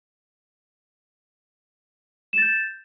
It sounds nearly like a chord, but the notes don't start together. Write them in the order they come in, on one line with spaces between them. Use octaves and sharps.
E7 A6 G6